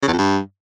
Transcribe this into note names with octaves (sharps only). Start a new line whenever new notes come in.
C#3
E2
F2
G2